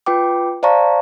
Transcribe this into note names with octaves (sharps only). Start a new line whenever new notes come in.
F4 B4 G5 D6
C5 D5 F5 A5 A#5 C#6